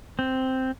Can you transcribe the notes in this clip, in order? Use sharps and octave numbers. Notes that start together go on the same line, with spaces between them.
C4